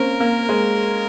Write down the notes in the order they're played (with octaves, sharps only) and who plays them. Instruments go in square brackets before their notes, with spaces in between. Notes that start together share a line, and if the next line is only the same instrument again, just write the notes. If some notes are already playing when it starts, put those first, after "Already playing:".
Already playing: [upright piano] A#3 C4 C#4 [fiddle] A#4
[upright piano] A#3
G#3